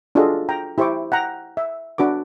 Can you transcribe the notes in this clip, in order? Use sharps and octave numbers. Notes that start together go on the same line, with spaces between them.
D4 F4 F#4 G#4 A4 D#5
G5 A#5
E4 G4 C5 E5 C#6 D6
F#5 G5 A#5
E5
D4 F#4 B4 D6